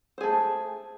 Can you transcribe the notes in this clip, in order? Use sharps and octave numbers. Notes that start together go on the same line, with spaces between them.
A3 G#4 C5